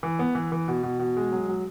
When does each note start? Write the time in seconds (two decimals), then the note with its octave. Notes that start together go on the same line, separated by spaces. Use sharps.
0.03 E3
0.19 B3
0.35 E3
0.52 E3
0.68 B2
0.83 B2
0.99 B2
1.17 G#3
1.32 F#3
1.48 F#3